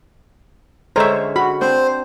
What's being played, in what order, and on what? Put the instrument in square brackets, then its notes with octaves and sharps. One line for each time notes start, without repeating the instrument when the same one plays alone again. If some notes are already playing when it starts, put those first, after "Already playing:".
[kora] D3 G#3 C#4 [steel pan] C5 C#5 [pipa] E5 A#5
[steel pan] F#4 [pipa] B5
[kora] C4 D4 [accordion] C5